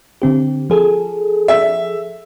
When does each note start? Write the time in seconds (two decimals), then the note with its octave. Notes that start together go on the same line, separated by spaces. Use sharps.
0.22 D3 C4 G4
0.70 F3 G#4 A4
1.48 E5